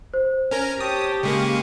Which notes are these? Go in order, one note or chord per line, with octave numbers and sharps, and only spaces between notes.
C5
C#4 A#4 A#5
G4 C#5 G5 A5 D#6
C#3 G#3 A#3 C#6 D#6